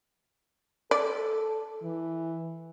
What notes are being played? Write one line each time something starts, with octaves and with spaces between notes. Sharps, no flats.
A4 D5
E3